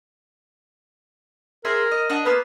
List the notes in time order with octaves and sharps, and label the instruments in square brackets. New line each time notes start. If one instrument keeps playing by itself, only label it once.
[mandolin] G#4 C5 E5 [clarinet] A#4
[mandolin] D#5
D4 D#5 F#5
[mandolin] A#3 B3 C5 [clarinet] B4